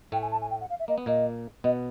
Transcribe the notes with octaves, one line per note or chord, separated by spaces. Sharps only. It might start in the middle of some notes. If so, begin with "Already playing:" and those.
A2 A3 G5
G#5
A5
G#5
G5
F#5
F5
E5
A#3 D#5
B3
A#2 A#3 D#5
B2 B3 D#5